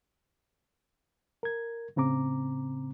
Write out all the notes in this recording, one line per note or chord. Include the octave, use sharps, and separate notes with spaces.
A#4 G#6
A2 C#3 C4 A#5 D6